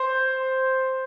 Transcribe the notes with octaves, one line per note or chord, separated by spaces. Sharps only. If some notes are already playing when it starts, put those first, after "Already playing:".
Already playing: C5